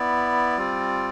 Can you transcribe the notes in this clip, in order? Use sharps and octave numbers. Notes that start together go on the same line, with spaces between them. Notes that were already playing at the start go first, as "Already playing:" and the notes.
Already playing: B3 E4 D5
G3 C4 F4